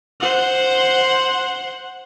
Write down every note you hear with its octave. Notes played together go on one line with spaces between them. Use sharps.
C5 F#5